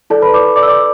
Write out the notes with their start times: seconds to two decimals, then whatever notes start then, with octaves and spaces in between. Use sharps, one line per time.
0.10 E4 A4 D5 A5
0.22 B4 B5
0.34 D5 D6
0.56 D5 D6
0.63 E6
0.67 D5 D6